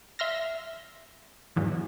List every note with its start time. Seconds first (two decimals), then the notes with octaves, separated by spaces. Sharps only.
0.19 E5 C6 F6 A#6
1.56 E2 G#2 E3 F#3